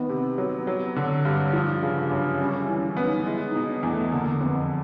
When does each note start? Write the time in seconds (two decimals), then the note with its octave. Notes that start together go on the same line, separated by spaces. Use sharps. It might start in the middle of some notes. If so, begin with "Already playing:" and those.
Already playing: D#3 B3
0.09 C3
0.38 F#3
0.67 F#3
0.96 D3
1.25 G2
1.53 F3 D4
1.83 C#3
1.96 D4
2.11 F#2
2.39 G3 C#4
2.62 C#4
2.68 E3
2.82 C#4
2.97 B3
3.04 D#4
3.26 G#3 E4
3.48 D#4
3.55 B2
3.69 D4
3.83 E2
3.90 A3
4.12 D3 A#3
4.40 F2 B3